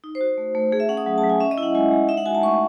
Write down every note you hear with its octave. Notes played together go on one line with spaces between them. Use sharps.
D#4
C5
F#4
A3
A3
A3 G#4
E5
C#4 F#5
D#6
F#3
A5
F#3
G#5
C#4 E5
D#5
E4
F#5
G#3 G#5
G#3
D#4 E5
F#5
F#4 G#5
A5
A3 C#6